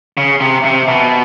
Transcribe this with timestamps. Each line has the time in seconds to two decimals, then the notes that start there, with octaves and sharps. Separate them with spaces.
0.17 C#3
0.41 C3
0.65 C3
0.88 B2